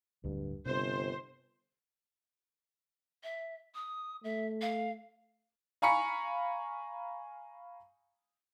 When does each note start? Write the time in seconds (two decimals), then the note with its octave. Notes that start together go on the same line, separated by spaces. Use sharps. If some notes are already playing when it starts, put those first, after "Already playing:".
0.24 D1 D2 G2
0.66 G1 C3 C5
3.23 E5
3.75 D#6
4.24 A3 E5
4.61 F5
5.82 F5 G#5 A#5 B5 C#6 C#7